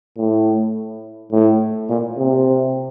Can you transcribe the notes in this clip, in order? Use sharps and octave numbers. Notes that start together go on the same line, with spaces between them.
A2
A2
A#2
C3